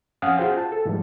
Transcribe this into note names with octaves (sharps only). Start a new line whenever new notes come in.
F2 C#4 F5 F#5 G#5 D#6
F4 F#4 G#4 C5 G5
A5
A4
G#2 E3 F3 G3 G#3